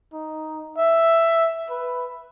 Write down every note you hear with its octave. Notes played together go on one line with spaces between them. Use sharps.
D#4
E5
B4